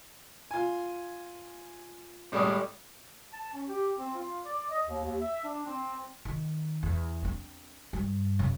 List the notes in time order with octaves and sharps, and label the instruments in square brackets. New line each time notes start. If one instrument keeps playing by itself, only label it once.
[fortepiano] F4 G#5
G#1 A2 G3 G#3 D5 D#6
[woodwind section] A5
C#4
G4
C4
F4
D5
D#5
D#2
D#2
E5
D4
C4
[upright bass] D#3
E2
C4 D4
G2
F#2 C#3